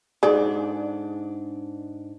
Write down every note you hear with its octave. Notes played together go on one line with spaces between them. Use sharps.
G#2 D4 G#4 A4 D5